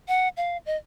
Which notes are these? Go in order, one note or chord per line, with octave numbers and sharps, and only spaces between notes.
F#5
F5
D#5